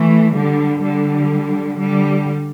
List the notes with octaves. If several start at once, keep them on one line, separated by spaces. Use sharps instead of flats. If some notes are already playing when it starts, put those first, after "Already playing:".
Already playing: E3 A3
D3 G3
D3 G3
D3 G3